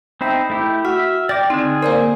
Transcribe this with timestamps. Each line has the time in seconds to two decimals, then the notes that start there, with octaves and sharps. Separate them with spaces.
0.21 C4 D#4 C5 E5 G5 B5
0.50 A3 E4 G4
0.85 F#4 E5 F6
1.29 D5 G5 D6 A#6
1.50 D3 C4 D#4 G#4
1.83 A#3 A#4 C5 D5 G#5